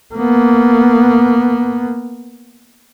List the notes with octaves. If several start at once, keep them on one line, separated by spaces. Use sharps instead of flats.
A#3 B3